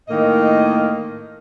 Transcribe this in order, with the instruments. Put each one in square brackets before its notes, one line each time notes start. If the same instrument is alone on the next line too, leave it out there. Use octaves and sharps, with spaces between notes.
[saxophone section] A2 D#3 A#3 D#5